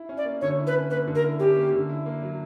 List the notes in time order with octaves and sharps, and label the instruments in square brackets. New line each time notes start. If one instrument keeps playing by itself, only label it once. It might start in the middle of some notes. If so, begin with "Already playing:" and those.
Already playing: [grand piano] E4
C#4
[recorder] D5
[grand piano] A#3
[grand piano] D3 [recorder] C#5
[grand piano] E4
[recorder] B4
[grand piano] C#4
[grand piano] A#3 [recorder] B4
[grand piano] D3
[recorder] A#4
[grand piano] E4
[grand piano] C#4 [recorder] G4
[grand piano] A#3
D3
E4
A#3
F#3